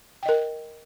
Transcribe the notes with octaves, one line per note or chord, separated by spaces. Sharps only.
A#4 D#5 G5